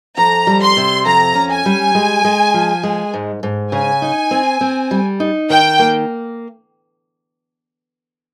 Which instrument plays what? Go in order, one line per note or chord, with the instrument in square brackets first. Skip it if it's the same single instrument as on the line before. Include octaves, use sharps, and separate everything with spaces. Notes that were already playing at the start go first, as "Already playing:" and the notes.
[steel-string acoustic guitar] F2 [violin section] A#5
[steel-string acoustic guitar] G3
[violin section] C6
[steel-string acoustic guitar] C3
[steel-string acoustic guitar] F2 [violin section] A#5
[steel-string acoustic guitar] C#4
[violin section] G#5
[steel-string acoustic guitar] G3
G#3
G#3
F3
G#3
G#2
G#2
[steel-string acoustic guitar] C#3 [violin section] G#5
[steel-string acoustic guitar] D#4
C4
C4
G3
D#4
[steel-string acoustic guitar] D#3 [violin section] G5
[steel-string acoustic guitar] A#3